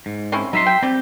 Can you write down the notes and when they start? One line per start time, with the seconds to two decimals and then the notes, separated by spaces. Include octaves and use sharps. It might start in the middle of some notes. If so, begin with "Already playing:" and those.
0.06 G#2
0.32 C4 C#4 E4
0.53 F#3 D#4 E5 C6
0.66 G5
0.83 G3 C4 G4